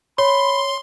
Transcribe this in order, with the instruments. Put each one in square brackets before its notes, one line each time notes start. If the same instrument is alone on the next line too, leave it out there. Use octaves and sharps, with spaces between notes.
[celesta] C#5 [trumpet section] B5 [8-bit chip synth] C6